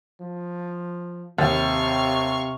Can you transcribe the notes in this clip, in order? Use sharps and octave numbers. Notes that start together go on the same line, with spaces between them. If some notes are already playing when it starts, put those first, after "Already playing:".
F3
D#2 C3 F5 C#6